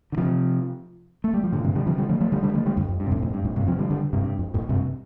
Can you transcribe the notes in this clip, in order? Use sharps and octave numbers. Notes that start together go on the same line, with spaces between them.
D3
C3 F3
A3
G3
F3
A2 D3
G2 C3
D3 G3
C3 F3
D3 G3
F3 A3
F3 A3
D3 G3
D3 G3
F3 A3
D3 G3
F2
F2
G2
C3
F2 A2
F2 A2
G2
F2 A2
G2 C3
C3 F3
D3 G3
D3 G3
G2 C3
G2
F2
F2 A2
G2 C3